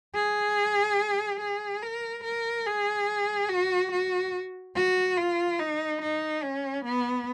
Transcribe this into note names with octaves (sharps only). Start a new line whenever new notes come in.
G#4
G#4
A#4
A#4
G#4
F#4
F#4
F#4
F4
D#4
D#4
C#4
B3